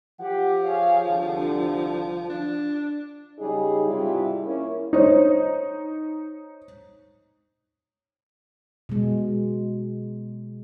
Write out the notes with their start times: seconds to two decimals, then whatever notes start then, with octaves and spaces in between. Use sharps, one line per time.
0.20 F3 G4 F#5
0.63 G#4 C#5 F5
1.08 C2 D3
2.30 D4
3.39 C#3 G3 D#4 G#4
3.87 G#2 C3 G3 E4 F4
4.43 A#3 C#4 E4
4.93 D#4 C5 C#5
8.89 B2 G#3